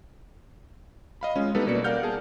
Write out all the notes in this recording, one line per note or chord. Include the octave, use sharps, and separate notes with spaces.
D#5 F5 B5
G#3 C#4 F4
G3 B3 D#4 A4 B4
B2 A#3 D5 C#7
A#4 D5 F5 F#5 F6 G6
G#4 A5